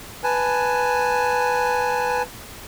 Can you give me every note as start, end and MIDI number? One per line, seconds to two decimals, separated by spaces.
0.24 2.23 71
0.24 2.23 80
0.24 2.23 81